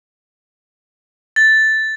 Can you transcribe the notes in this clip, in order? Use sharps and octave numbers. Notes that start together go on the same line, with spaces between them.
A6